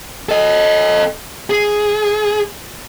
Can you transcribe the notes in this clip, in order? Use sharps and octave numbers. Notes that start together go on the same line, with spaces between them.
A4 D#5
G#4